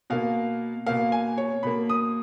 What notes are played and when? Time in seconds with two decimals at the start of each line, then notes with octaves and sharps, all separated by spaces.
0.10 B2 A#3 F5
0.86 B2 A#3 F5
1.12 G#5
1.38 C#5
1.63 B2 A#3 B5
1.89 D#6